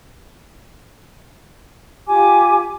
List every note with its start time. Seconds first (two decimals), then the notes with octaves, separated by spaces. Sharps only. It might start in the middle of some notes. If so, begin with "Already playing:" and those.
2.08 F4 G4 G#5 D6